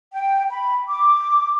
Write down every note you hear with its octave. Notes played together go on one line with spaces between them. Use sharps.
G5
B5
D6